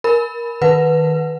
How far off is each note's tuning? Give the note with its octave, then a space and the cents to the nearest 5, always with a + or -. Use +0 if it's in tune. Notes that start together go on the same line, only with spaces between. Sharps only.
A#4 +15 B5 +0
D#3 +0 B4 +0 F#5 -10